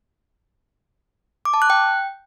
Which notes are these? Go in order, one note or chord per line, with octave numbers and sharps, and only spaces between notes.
D6
A5
F#6
G5